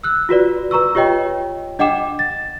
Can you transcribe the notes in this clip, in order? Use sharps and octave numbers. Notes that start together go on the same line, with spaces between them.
E6 F#6
F4 F#4 B4 D5
B4 A#5 C#6 E6
F4 G4 C#5 D#5 G5
D4 D#5 F#5 G5 D6 E7
A6